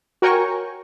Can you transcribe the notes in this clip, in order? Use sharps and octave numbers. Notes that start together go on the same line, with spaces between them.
F#4 A#4 C#5 G5 G#5 C#6